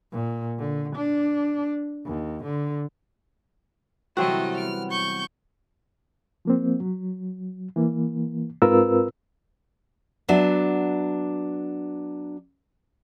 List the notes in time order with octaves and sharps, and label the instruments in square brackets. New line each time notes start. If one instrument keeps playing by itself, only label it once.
[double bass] A#2
D3
D4
D#2
D3
[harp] C3 E3 G3 [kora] F#3 C4 F#4 [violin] A3 D#5
[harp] B3 D7 [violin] F6
[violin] C#6 G6
[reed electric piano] F3 A#3 C4
F#3
E3 A#3
G#2 C4 F4 A#4 B4 E6
[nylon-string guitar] F#3 B3 D4 E5